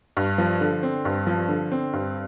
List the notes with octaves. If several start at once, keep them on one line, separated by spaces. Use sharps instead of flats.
G2
F3
D3
C4
G2
F3
D3
C4
G2